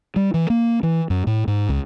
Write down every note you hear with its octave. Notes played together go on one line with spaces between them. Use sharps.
G3
E3
A#3
E3
F#2
A2
G#2
C#2